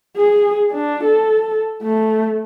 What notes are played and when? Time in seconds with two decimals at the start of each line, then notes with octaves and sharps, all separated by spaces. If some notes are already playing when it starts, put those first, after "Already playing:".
0.17 G#4
0.72 D4
1.04 A4
1.82 A3